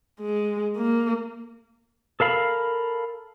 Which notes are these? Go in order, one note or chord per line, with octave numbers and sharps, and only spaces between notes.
G#3
A#3
A4 A#4 F5 B5